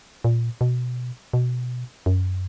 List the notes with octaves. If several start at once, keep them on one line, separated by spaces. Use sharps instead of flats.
A#2
B2
B2
F#2